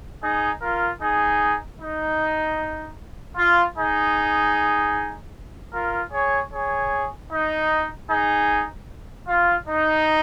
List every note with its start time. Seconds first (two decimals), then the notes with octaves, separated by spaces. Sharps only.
0.22 D#4 G#4
0.62 F4 A#4
1.00 D#4 G#4
1.80 D#4
3.36 F4
3.76 D#4 G#4
5.72 F4 A#4
6.12 G#4 C#5
6.52 G#4 C#5
7.31 D#4
8.09 D#4 G#4
9.27 F4
9.67 D#4